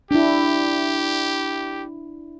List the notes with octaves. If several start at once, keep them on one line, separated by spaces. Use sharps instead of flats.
D4 E4 G4